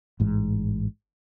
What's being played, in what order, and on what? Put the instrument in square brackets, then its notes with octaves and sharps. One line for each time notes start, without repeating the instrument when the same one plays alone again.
[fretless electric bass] A1 G#2